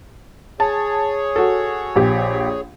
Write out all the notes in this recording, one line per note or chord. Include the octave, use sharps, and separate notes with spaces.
G#4 C#5 A5
F#4 A4
A#1 G4